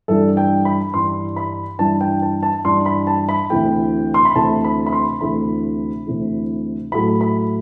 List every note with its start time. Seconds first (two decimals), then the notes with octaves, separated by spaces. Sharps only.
0.08 G2 E3 G3 D4 A4
0.37 G5
0.65 B5
0.94 G2 E3 G3 D4 C6
1.36 B5
1.79 G2 E3 G3 D4 A5
2.01 G5
2.22 A5
2.43 A5
2.65 G2 E3 G3 D4 C6
2.86 B5
3.07 A5
3.29 B5
3.50 D2 C3 E3 A3 G5
4.14 C6
4.25 B5
4.35 D2 C3 E3 A3 A5
4.64 B5
4.86 B5
4.92 C6
5.21 D2 C3 E3 A3 B5
6.07 D2 C3 E3 A3
6.92 A2 F#3 A3 E4 B5
7.21 B5